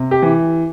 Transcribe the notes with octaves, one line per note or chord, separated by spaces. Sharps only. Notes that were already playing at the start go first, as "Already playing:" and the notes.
Already playing: C3
G4
E3